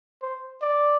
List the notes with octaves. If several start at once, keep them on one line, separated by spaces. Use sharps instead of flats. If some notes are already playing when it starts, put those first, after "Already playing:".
C5
D5